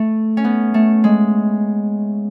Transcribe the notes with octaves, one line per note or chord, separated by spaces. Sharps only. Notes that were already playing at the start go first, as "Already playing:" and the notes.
Already playing: A3
C#4
B3
A3
G#3